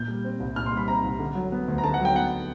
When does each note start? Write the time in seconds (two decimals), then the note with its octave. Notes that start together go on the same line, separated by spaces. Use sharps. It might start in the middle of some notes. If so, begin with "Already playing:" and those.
Already playing: A#2 G6
0.08 G3
0.25 C4
0.40 C2
0.56 A#2 F6
0.66 C6
0.72 G3
0.77 B5
0.88 C4 A#5
1.04 C2
1.19 D3
1.35 F#3
1.52 B3
1.68 D2
1.78 A#5
1.84 D3 A5
1.94 F#5
2.00 F#3
2.05 G5
2.15 B3 F#5